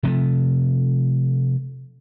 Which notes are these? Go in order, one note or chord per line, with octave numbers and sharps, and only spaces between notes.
C3 F3 A3